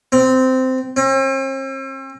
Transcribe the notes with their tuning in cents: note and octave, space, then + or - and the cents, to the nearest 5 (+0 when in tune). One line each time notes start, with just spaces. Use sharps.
C4 -15
C4 +45